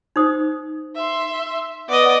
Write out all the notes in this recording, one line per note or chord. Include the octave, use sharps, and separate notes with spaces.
D#4 C5 D#6
E5 C6
B3 D5 D#5